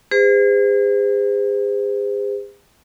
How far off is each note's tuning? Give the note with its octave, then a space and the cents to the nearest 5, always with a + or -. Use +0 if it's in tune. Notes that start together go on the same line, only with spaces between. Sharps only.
G#4 -40 C5 -40